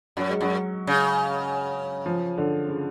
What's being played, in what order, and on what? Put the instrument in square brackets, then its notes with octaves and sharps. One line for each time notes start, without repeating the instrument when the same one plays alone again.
[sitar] F#2 [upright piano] F#3
[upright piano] G#3
[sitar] F#2 [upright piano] F#3
[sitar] C#3
[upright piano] F3
D3
C#3